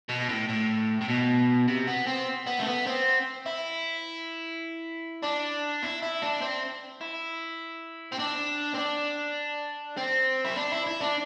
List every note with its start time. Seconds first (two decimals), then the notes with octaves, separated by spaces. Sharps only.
0.09 B2
0.29 A2
0.49 A2
1.01 A2
1.08 B2
1.68 C3
1.87 B3
2.07 C4
2.47 B3
2.59 A3
2.66 B3
2.87 C4
3.46 E4
5.23 D4
5.83 E4
6.02 E4
6.22 D4
6.42 C4
7.01 E4
8.12 C4
8.19 D4
8.75 C4
8.79 D4
9.98 C4
10.45 E4
10.56 D4
10.72 E4
10.87 E4
11.01 D4